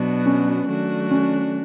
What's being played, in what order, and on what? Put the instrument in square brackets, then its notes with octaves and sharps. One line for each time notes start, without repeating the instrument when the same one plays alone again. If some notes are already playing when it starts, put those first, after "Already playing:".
Already playing: [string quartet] B2 F#3 B3 D4 F#4
[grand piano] C#4
[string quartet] D#3 F#3 A3 D4 F#4
[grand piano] C#4